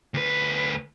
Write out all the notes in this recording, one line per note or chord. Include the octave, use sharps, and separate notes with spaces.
D2 B4